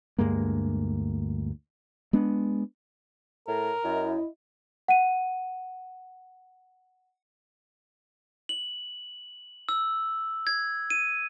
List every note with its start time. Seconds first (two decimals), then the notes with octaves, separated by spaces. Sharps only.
0.18 D2 G2 G#3 A#3
2.13 G#3 B3 D4
3.48 A2 A#4
3.84 F#2 E4 D#5
4.88 F#5 D#7
8.49 F#7
9.69 E6
10.47 G#6
10.90 D#7